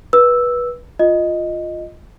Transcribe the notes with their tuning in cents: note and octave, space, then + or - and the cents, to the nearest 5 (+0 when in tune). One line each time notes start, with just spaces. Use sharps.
B4 -20 E6 +0
F4 +5 D#5 +0